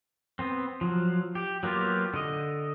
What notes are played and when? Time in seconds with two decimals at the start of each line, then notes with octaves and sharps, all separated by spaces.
0.39 B3 C4
0.81 F3 F#3
1.35 G4
1.63 F#3 A#3 B3 F4 G4
2.14 D3 D#5